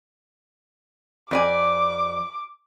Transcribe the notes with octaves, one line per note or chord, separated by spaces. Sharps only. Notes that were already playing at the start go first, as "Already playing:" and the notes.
F2 D5 G#5 D6